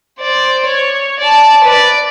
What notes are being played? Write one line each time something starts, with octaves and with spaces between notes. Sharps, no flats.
C5 D5
C#5
D5 A5
B4 D5